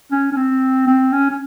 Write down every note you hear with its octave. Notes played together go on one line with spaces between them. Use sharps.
C#4
C#4
C4
C4
C#4
C#4